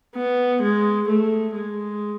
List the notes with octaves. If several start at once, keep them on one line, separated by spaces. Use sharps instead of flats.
B3
G#3
A3
G#3